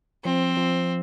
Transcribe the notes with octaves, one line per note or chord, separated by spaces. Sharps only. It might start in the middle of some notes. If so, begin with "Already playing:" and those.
F3 C4
F3